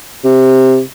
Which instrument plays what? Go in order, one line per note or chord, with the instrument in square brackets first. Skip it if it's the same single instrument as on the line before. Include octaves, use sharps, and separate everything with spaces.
[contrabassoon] C3